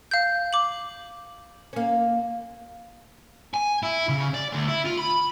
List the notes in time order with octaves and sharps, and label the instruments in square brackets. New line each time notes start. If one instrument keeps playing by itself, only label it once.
[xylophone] F5 G6
D6 F#7
[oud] A#3 C#4
[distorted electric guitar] G#5
E4
C#3
D5
D2
E4
F4
B5